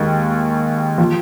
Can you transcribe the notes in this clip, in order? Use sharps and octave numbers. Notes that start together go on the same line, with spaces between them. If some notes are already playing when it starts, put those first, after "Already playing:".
Already playing: D#2 D#3 G#3
F3